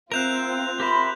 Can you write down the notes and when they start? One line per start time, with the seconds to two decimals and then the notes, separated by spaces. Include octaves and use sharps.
0.12 C4 F4 A#4 E5 F5 F#6 G6 F7
0.80 G4 A#4 E5 B5 C6